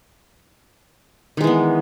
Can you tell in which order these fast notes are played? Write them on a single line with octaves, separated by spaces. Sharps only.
D#3 G#3 E3 B3